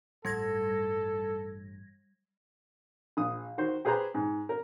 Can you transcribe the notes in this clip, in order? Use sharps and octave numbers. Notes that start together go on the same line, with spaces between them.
A1 G2 G3 A4 G#6 A#6
A#1 D#6
D#3 F#4 C5
G4 G#4 B4 C5 A#5 B5
G#2
A#4